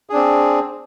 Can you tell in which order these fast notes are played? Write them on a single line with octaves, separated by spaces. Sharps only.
G#4 D4 C4